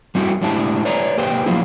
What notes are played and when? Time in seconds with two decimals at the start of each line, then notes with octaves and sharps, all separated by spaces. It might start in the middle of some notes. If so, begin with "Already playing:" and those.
0.15 G3 C4 E4 F#4 G4 A#4
0.41 A2 G#3 D4 E4 G4 A5
0.85 B4 C#5 D5 A#5
1.18 A#3 G4 G#4 B4 C5 G5
1.46 F3 F#3 A#3 E4